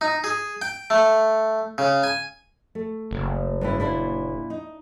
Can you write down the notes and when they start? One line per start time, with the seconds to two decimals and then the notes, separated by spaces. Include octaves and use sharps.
0.01 D#4
0.24 G#4
0.62 G5
0.90 A3
1.78 C#3
2.03 G#5
2.75 A3
3.11 F#1
3.61 G2 C#3 E4
3.80 A#2 D4 E4
4.50 D#4